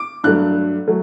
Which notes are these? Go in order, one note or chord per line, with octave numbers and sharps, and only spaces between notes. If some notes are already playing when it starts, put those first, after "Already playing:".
Already playing: D6
G2 F#3 A3 F#6
F#3 A3